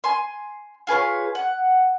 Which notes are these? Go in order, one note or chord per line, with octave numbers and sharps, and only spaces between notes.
G#5 C6
F4 G#4 B4 C#5
F#5